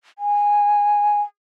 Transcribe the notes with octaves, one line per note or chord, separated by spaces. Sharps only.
G#5